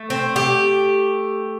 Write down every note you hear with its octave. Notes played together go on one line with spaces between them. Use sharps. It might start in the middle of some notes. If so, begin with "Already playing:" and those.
Already playing: A3
C4
G4